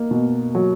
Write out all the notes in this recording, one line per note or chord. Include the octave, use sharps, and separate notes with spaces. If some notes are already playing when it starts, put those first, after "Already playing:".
Already playing: A#3 D#4
B2
F#3